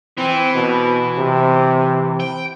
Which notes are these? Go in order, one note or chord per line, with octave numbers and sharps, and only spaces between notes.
E3 C4
B2
C3
G5